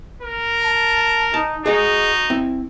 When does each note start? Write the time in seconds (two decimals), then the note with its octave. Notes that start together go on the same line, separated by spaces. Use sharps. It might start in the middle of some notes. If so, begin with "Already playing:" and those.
0.22 A#4
0.64 A5
1.34 D#4 A5
1.66 D#4 F#4 G#4 D#5
2.30 C4 E4